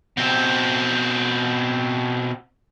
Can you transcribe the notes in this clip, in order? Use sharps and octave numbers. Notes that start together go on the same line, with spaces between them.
B2 C4